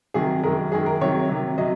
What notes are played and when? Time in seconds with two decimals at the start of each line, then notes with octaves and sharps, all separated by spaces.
0.14 C3 D#3 F#3 G#4
0.43 F#2 D#3 G#3 A#4
0.72 F#2 D#3 G#3 G#4
0.86 A#4
1.01 C3 D#3 F#3 C#5
1.29 C3 D#3 F#3
1.58 C3 F#3 D#5